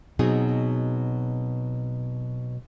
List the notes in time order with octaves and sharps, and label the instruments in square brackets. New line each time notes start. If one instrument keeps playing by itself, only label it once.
[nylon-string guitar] B2 F#3 C4 D#4 G#4